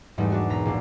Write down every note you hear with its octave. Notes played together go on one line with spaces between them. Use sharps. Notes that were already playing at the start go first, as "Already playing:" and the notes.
E2 G#2 G3 A3 D#4
D4 F#4 A#4
B1 A#5 B6
A#1 D4